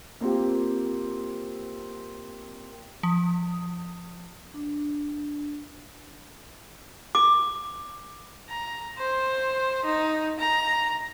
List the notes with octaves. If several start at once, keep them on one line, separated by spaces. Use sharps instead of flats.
A#3 C4 F4 G4
F3
D4
D6
A#5
C5
D#4
A#5